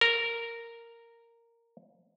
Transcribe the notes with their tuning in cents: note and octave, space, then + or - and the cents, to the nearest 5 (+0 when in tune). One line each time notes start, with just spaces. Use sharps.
A#4 -5